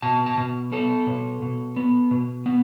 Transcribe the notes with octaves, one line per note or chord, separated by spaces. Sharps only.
B2 A5
A5
B2
B3 A4
B2
B2
B3
B2
B3